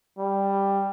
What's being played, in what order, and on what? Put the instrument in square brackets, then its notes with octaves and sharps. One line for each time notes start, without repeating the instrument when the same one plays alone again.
[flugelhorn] G3